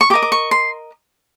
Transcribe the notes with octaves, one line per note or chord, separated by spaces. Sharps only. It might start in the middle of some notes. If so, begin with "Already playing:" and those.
C#6
G4 D6
A#4 D#5
D6
C#6
C6